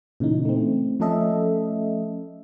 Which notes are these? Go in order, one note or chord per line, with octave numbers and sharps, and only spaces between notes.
A#2 C#3 E3 D#4
A3 C4
F3 A3 C#4 A4 D#5 E5